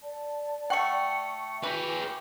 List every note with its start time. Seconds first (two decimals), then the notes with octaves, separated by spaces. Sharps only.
0.01 D5 A5
0.70 A3 F#5 G5 C#6 C#7
1.63 E3 F#4 G#4 B4 D6 G6